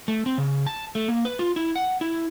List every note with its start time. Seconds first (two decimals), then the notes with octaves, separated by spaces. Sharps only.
0.08 A3
0.26 C4
0.38 C#3
0.67 A5
0.95 A3
1.08 A#3
1.25 B4
1.39 F4
1.56 E4
1.76 F#5
2.01 E4